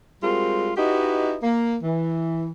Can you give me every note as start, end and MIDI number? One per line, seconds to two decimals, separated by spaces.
0.23 0.71 55
0.23 0.71 56
0.23 0.71 60
0.23 0.71 65
0.23 0.71 66
0.23 0.71 70
0.77 1.37 63
0.77 1.37 64
0.77 1.37 66
0.77 1.37 67
0.77 1.37 71
0.77 1.37 75
1.43 1.76 58
1.83 2.50 52